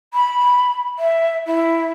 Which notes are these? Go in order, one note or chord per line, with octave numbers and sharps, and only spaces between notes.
B5
E5
E4